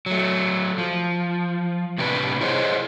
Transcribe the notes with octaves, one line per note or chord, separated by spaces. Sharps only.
F#3 A3
F3
A2 C3 G3 D4 G4 B4
E4 G#4 C5 C#5 D#5